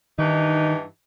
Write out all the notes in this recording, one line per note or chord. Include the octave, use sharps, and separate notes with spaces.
G2 D#3 E3 D#4